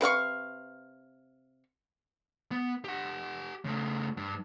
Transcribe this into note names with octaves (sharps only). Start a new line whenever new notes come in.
C3 B4 F5 C#6
B3
G4 F#5
C#3 A3
G2